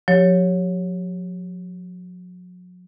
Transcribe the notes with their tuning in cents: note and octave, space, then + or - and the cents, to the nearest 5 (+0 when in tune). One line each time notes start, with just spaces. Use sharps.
F#3 -45 G4 +0 C#5 +0